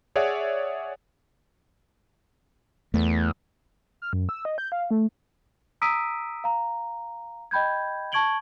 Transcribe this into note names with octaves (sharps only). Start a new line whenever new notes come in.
G#4 C#5 D5 E5 F#5
E2 A3
F6
F#2
E6
D#5
G6
F5
A3
A#5 D#6 E6 B6 D7 D#7
F5 A#5
D#5 G5 B5 G6 G#6
A5 C#6 G#6 D7 F#7 G7